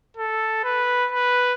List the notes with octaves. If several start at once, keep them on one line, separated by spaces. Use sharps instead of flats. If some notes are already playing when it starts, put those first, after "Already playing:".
A4
B4
B4